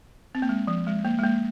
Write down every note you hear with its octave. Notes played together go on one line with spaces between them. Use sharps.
C4
A#3
G#3
F3
G#3
A#3
G#3
A#3